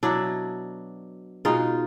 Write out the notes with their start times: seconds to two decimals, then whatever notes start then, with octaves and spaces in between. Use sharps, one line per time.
0.03 B2 F#3 D4 E4
1.45 B2 G#3 D#4 F4